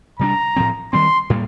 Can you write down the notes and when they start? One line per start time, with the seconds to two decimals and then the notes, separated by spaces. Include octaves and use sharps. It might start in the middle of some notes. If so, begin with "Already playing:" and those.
0.19 C3 G3 A#3 D4 A#5
0.56 A2 F3 C4
0.93 D#3 G3 C4 C6
1.30 A2 G3 A#3